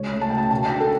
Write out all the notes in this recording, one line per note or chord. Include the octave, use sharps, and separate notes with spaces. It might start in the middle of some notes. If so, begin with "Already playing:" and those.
Already playing: C#2 C#5
A3
A5
C#3 G5
A5
B2 A5
G5
D4
A4